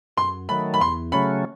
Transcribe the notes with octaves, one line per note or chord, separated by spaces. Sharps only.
F#2 C6
D#3 F#3 A3 B5
B5
E2 C6
C#3 F#3 A3 C#4 B5